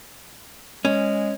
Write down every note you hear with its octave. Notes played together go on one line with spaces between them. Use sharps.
G#3 C#4